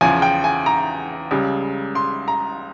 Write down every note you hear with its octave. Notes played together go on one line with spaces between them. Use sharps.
E2 C#3 F3 G#5
G5
G#5
A#5
C#2 C#3 G3
C6
A#5